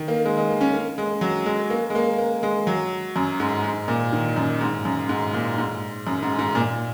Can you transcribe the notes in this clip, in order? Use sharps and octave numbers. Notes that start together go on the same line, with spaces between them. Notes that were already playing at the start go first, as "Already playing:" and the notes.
Already playing: D#3
A#3
G#3
G#3
A#3
C#4
A#3
G#3
F#3
G#3
A#3
G#3
A#3
A#3
G#3
F#3
F#2
G#2
G#2
A#2
D#3
F#2
G#2
F#2
G#2
A#2
G#2
F#2
G#2
G#2
A#2